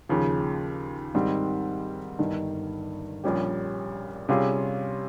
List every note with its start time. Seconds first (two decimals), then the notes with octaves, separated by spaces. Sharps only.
0.09 D#2 C#3 F3
1.14 G#2 D#3 G3 C4
2.19 G1 G2 D#3
3.24 A#1 A#2 G3 C#4 G4
4.29 C3 G3 C#4 F4 G#4